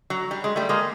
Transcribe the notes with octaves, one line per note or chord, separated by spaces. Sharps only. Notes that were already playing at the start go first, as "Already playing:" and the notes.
F#3
G3
G#3
G3 A3
G#3 A#3